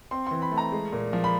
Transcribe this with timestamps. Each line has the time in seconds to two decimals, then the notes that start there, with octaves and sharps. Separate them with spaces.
0.11 C4 C6
0.27 E3 C6
0.42 B5
0.51 A3
0.57 A#5
0.72 G#3
0.93 A#2
1.13 F3
1.24 B5